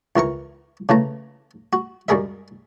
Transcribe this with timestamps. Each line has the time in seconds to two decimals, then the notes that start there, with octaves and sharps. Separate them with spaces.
0.16 C#2 E3 A#4 C#6
0.89 C#3 E3 A3 A#5
1.73 F#4
2.08 F#2 G3 G#3 G#4 A#4 E5